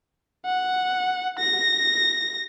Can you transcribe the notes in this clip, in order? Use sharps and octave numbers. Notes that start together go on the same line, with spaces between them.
F#5
A#6